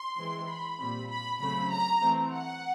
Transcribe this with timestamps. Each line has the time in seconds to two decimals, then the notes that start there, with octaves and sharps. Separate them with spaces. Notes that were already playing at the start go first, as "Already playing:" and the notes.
Already playing: C6
0.17 E3 G#3 C4
0.47 B5
0.79 A#2 G3 C4
1.10 B5
1.40 C#3 F#3 A3 C4 B5
1.71 A#5
2.02 E3 A3 C4
2.33 F#5